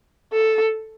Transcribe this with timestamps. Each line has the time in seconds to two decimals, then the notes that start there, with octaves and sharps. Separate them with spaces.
0.33 A4